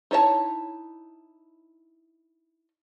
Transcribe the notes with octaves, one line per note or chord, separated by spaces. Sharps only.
D#4 E4 C#5 D5 A5